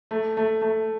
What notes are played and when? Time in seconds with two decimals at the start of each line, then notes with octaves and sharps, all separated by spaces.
0.11 A3
0.37 A3
0.62 A3